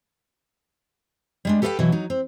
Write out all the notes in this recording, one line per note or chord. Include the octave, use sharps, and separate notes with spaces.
G3 G#3 D4
G4 A4 B4 D5 F5 G5
B2 E3 F#3
F#3 D#4
C4